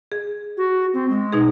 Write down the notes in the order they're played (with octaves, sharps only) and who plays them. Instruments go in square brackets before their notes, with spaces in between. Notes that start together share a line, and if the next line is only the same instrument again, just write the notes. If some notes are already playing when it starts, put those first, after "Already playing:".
[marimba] G#4
[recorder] F#4
C4
G#3
[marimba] B2 D#4 G#4